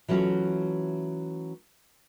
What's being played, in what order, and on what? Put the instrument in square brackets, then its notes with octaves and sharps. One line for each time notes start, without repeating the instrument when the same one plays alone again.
[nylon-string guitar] E3 F#3 A3 C#4 F4 F#4